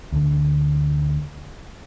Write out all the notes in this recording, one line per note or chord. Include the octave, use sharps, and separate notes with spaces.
D2 D3